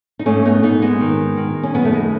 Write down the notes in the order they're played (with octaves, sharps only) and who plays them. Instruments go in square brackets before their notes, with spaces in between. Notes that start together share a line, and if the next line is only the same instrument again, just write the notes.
[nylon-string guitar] D#4
G#2 A3 C#4
B3 D#4
G#2 B3 D#4
G#3 B3
D#3
D#3
C#4
F#2 G#3 B3
A3
G#3